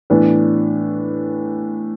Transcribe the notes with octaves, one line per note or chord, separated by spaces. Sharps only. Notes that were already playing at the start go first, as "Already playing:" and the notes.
A2 E3 B3 D4